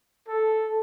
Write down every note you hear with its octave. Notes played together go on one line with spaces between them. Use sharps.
A4